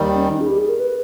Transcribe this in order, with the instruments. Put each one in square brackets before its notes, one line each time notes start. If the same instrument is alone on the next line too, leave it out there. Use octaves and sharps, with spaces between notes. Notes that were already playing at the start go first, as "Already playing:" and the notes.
Already playing: [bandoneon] D#2 D#3 G3
[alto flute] C#4
D#4
G#4
G4
G#4
A#4
B4